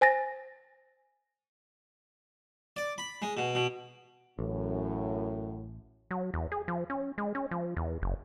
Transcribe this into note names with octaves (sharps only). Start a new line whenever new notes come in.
C5 G#5 A6 A#6
D5
B5
G#3
B2
B2
A1 F#2 A2
F#3
E2
G#4
F3
C#4
G#3
C#4
F3
E2
F#1